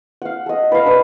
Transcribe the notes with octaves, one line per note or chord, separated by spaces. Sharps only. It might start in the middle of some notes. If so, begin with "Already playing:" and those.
F5 F#5
A4 D#5
B4 F5
D4 B4 D5